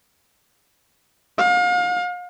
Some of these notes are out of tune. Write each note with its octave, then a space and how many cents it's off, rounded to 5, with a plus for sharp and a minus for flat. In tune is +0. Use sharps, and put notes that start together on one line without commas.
F5 +35